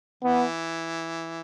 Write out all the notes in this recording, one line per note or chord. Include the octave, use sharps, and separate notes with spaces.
E3 B3